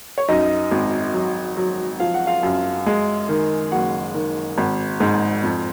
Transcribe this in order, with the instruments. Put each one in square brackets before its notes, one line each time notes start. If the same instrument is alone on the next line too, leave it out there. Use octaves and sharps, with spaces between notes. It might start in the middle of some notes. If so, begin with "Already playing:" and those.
[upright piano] C#5
F#2 D#4 D#5
G#1
F#3
F#3
F3 F5
F#5
F4 F5
F#2
G#3
D#3
F#1 F#4 F#5
D#3
G#1
G#2
F2